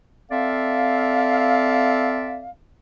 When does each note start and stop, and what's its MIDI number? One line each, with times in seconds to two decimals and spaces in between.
0.31 2.49 60
0.31 2.49 69
0.31 2.49 74
0.31 2.49 76
0.31 2.49 77